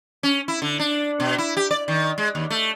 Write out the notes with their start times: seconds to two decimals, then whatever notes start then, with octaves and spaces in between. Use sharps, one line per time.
0.23 C#4
0.48 E4
0.62 D3
0.79 D4
1.20 B2
1.38 E4
1.57 G4
1.71 D5
1.88 D#3
2.18 G#3
2.35 D#2
2.50 A3